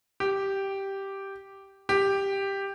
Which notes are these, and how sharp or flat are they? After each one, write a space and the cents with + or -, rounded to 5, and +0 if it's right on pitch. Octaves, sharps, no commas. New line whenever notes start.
G4 -5
G4 +5